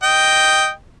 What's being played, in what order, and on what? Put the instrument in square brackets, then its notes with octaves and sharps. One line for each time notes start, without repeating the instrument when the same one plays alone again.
[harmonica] D#5 G5